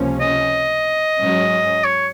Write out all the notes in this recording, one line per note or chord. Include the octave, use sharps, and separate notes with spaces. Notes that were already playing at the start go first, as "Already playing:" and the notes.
Already playing: C#2 C3 F3 A#3 C#4
D#5
G#2 F#3 C#4
C#5